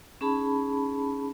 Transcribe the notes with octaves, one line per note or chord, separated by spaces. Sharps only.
C#4 D#4 G#4 A5 B5